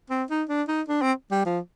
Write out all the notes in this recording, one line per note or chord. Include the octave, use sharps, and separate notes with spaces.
C4
D#4
D4
D#4
D4
C4
G3
F3